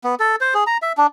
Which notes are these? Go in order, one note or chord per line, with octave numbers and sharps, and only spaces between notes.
B3
A4
C5
G#4
A#5
E5
D4